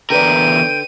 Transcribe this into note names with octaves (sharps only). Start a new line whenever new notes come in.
E2 D3 A#4 B4 D5 G5 D#7